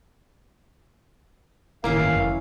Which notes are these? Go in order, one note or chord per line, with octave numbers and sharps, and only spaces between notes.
G1 A2 D#3 E3 A#3 C#4 E4 F5
F#1